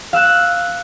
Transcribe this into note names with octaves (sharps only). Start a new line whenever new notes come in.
F5 E6 F#6 E7